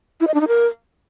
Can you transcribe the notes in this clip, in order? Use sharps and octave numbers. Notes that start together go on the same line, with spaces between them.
E4
D#5
D4
D#4
A#4